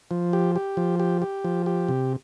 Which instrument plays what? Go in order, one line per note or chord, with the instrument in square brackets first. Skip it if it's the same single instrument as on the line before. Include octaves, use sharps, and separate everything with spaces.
[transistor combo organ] F3
G4
G4
F3
G4
G4
F3
G4
C3